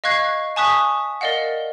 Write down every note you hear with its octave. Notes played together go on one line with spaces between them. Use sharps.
D#5 F5 C#6 F#6 G#6 C7
G#5 A5 C#6 D#6 F#6 B6
A#4 D5 D#5 F5 F#5